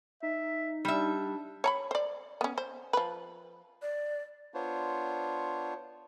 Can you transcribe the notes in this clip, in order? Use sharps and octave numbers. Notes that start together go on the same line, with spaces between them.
D#4 E5
G3 D4 E5
C#5 A#5 B5
C5 D5
B3 C#4
C5
F3 B4
D5
B3 D4 F4 C5 C#5